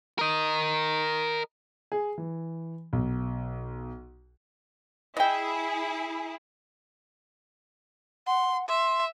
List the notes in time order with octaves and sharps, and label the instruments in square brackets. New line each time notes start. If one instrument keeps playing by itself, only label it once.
[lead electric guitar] A#4 D#5
[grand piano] G#4
E3
B1
[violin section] E4 G#4 [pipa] D#5 G5
[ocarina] F#5 [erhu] C6
[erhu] E5 [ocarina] C6